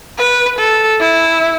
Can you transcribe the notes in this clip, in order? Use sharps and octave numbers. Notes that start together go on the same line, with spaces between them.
B4
A4
E4